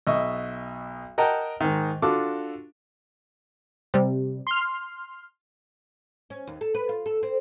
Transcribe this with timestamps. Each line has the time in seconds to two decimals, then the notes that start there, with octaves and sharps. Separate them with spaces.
0.07 B1 D#5 E5 C#6
1.18 A#4 D#5 F#5 G5 A5 A#5
1.61 G#2 D#3
2.02 D4 F4 F#4 A4 D6
3.94 C3 G3
4.47 C6 F6
6.30 C#4
6.47 D#2
6.61 A4
6.75 B4
6.89 F4
7.06 A4
7.23 C4